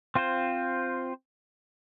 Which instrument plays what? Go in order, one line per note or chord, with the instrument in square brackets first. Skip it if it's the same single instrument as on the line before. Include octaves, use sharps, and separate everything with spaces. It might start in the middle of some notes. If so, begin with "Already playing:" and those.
[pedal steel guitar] C4 F4 C5